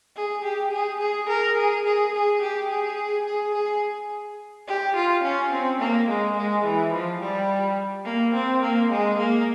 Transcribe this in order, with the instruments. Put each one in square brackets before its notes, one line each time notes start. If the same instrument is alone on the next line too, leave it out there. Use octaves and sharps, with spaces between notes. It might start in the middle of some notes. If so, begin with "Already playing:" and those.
[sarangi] G#4
G4
G#4
G#4
A#4
G#4
G#4
G#4
G4
G#4
G#4
G#4
G4
F4
C#4
C4
A#3
G#3
G#3
E3
F3
G3
A#3
C4
A#3
G#3
A#3